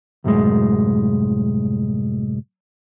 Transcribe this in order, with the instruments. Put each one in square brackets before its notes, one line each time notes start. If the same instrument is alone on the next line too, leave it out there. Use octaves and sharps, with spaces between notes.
[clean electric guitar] C2 F#2 A2 G#3